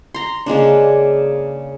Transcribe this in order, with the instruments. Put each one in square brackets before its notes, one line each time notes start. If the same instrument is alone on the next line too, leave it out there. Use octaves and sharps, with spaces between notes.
[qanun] A#5 C6
C#3 G#3 A#3 D4